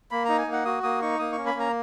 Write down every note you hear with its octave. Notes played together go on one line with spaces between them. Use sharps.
A#3 B5
D#4 A#5
G#5
A#3
F#5
F#4 D#6
A#3 D#6
D#4 C#6
A#3 D#6
C#6
C#4
B5
A#3 A#5